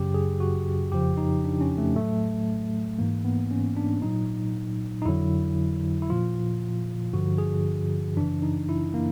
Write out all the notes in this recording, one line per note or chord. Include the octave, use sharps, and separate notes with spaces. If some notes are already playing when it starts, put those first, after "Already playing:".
Already playing: F#2 C#3 F#3 G4
G#4
F#4
F2 C#3 F3 G4
D#4
D4
C#4
A3
A2 F#3 A3
G#2 E3 A#3
B3
C#4
D4
A#2 F#3 D#4
D#4
F2 D3 F#3 E4
E4
A#2 F3 F4
G2 D3 F3 F#4
G#4
F#2 C#3 E3 D4
D#4
E4
A#3